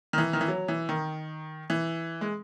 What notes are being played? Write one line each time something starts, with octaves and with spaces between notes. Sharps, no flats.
D#3
E3
D#3
E3
F#3
E3
D#3
E3
G#3